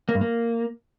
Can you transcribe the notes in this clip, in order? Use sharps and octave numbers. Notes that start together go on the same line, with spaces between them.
A#3
G2
A#3